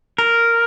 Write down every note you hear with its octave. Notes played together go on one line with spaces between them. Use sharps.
A#4